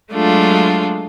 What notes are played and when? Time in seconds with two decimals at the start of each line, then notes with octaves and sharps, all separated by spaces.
0.12 F#3 G#3 A3 D4 F4